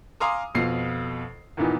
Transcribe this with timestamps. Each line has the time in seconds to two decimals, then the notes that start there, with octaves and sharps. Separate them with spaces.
0.20 F5 G#5 A#5 C6 D6 D#6
0.55 F2 B2 F4 C7
1.57 D#2 A#2 E3 B3 D#4